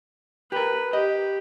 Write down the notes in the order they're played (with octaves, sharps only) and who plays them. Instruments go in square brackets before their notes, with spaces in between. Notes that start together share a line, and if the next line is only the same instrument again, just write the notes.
[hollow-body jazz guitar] G4 A#4 [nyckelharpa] B4
[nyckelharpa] G4 [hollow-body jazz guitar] D#5